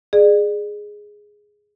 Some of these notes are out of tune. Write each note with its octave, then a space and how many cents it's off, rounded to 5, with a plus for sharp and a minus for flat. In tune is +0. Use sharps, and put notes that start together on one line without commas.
G#4 +0 D5 +35